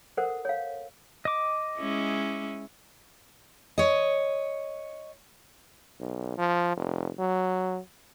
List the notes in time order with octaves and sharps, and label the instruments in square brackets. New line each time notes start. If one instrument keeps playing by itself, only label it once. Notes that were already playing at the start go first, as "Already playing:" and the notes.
[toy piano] A4 A#4 C5 F#5
C#5 F5
[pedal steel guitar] D#5 D6
[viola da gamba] G#3 C#4 E4
[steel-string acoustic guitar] C#5 D#5
[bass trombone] B1
F3
F1
F#3